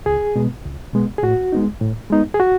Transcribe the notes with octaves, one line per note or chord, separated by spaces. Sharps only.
C#2 G#4
B2 G#3 B3
C#2
B2 G#3 B3
G#4
A2 F#4
G#3 B3 D#4
A2
G#3 B3 D#4
G#4
F#4